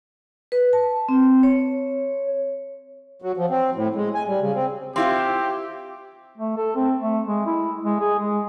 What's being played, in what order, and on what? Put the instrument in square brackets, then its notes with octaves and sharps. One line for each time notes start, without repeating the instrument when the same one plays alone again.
[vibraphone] B4
A5
C4
C#5
[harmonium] F#3
F3
C4
A2
G#3
G#5
G3
C#3
C4
[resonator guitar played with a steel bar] C4 E4 F4 [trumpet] G4
[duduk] A3
A4
C4
A3
G#3
E4
G#3
G#4
G#3